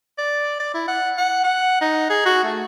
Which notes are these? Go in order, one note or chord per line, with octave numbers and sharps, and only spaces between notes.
D5
D5
E4
F#5
F#5
F#5
D#4
G#4
F#4
A3